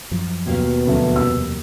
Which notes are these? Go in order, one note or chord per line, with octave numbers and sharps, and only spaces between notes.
F#2 F3
D#2 B2 F5
D2 D#3 F3 F#3
F2 C3 G3 E6